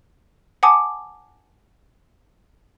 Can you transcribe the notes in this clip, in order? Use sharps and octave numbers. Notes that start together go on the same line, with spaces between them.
F#5 G#5 A5 D6 D#6